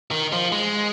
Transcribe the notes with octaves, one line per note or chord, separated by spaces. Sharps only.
D#3
F3
G#3